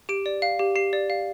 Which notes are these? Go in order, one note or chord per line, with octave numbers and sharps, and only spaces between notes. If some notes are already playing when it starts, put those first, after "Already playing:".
G4 D7
D5
F5
G4
G4 C7
D5
F5